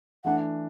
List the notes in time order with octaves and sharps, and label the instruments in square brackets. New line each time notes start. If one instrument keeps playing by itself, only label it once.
[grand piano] E3 A3 D4 [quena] F#5